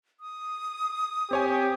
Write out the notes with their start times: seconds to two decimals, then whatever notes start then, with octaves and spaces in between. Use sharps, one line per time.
0.20 D#6
1.31 C4 G4 C#5 G#5